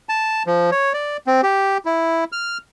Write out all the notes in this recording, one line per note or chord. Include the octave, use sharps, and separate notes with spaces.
A5
F3
C#5
D5
C4
G4
E4
F6